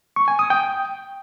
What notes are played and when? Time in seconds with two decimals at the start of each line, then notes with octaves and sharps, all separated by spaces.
0.16 C#6
0.28 G#5
0.39 D#6
0.50 G5